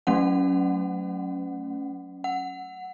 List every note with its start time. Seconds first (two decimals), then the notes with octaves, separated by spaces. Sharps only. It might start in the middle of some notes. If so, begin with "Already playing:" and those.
0.07 F#3 A3 C#4 F#5
2.24 F#5